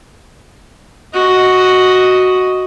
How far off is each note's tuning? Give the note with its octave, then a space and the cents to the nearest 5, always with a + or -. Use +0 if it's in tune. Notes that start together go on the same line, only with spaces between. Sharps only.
F#4 +0 D#5 +0